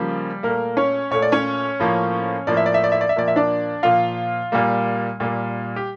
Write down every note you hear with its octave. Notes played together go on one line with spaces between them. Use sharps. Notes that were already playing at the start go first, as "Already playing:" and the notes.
Already playing: C#3 F3 G3 A#3
A#2 A3 A#3 A#4
C#4 C#5
A#2 A3 C#5
D5
C#4 C#5
A2 F3 A#3
A2 F3 A#3 D5
E5
D5
E5
D5
E5
D5
E5
A#2 F3 A#3 D5
E5
D4 D5
A#2 F3 A#3 F4 F5
A#2 G3 A#3
A#2 G3 A#3
G4